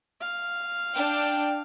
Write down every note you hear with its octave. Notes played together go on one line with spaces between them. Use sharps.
F5
D4 G5